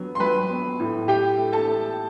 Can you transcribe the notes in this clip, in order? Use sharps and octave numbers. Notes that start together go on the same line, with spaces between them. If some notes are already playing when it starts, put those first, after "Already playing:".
Already playing: F#3 B3
C6
F#3 B4 B5
B3
A2
A3 G4 G5
A3
A4 A5
A3